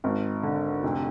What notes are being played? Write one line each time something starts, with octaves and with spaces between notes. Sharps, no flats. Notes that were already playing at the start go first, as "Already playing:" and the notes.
G#1
D3
F1